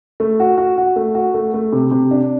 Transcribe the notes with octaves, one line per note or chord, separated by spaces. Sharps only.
A3
F#4
F#4
F#4
A3
F#4
A3
A3
C3
C3
D4